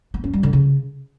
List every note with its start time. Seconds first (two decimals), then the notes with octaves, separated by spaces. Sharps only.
0.14 B3
0.24 C#4
0.33 G3
0.43 D3
0.53 C#3